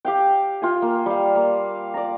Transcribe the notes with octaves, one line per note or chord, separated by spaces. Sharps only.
G4 F5 G5
F4 G5 G#5
A#3
G3 F5
A#3
D5 A#5